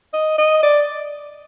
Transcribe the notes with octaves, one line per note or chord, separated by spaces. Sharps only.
D#5
D#5
D5